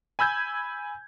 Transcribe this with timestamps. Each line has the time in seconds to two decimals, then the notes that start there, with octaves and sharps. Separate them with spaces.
0.19 G#5 B5 E6 G6 G#6